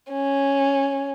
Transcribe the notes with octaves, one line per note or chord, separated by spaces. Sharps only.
C#4